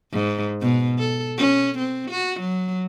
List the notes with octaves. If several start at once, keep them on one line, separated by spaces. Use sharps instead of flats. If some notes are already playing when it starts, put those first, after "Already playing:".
G#2
B2
A4
C#4
C4
F#4
F#3